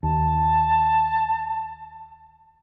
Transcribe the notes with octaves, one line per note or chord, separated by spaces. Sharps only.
D#2 A5